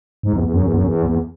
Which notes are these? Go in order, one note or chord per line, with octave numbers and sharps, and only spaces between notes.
G#2
E2
E2
F#2
E2
F#2
E2
E2